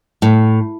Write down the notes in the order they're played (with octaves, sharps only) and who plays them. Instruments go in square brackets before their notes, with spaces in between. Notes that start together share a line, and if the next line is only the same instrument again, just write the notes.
[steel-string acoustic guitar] A2